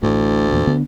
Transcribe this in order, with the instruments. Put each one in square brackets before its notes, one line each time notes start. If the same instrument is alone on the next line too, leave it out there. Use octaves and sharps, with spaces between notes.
[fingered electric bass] A1 A2 [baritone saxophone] D2
[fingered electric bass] E2 A#2
D3 B3 D4